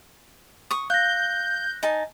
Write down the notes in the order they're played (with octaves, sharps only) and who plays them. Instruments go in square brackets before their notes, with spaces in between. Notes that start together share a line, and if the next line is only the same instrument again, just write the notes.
[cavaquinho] C#6 D#6
[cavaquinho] F5 [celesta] F#6 A#6 [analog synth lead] G6
[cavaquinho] D#4 G#5 A5